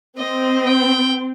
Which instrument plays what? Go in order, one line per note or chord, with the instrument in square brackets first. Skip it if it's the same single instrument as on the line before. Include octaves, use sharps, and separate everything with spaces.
[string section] C4 [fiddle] D#5
[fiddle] G5